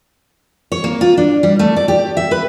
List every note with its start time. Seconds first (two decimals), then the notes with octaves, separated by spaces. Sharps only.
0.72 C#5
0.84 A#3
1.01 F4
1.17 D4
1.43 G3
1.59 A3
1.76 D5
1.88 G4
2.17 E5
2.31 B4